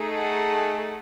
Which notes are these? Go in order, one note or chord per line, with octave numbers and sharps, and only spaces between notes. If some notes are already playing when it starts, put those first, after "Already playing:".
Already playing: A3 D#4 G#4
F#5 A5